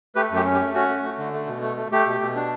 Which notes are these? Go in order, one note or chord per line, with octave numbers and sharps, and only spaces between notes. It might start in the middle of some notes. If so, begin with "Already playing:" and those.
A3 G4 B4
F#2
G4
C#4
G4
A3
C#4 F#4
A3
A3
D3
A3
B2
A3
A3
A3 G4
B2
B2
D4